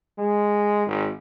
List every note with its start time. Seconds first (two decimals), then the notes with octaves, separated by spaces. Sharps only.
0.19 G#3
0.87 G#1